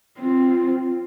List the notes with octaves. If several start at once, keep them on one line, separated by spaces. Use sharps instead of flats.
C4 F4